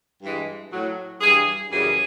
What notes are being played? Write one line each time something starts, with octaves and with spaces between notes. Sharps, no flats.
G2 E3 G#3
A2 F#3
G2 E3 G3 G#4
F#2 C#3 E3 G3 G#4